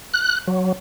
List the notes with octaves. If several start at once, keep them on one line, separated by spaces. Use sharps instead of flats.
F#6
F#3